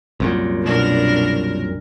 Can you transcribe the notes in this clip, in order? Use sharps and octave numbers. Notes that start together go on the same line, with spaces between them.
C2 F#2 A#2
B2 D4 A#4